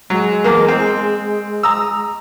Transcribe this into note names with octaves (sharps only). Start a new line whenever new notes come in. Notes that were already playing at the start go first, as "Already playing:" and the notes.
F#3 G#3
E2 A#3
C4
A#5 D#6 E6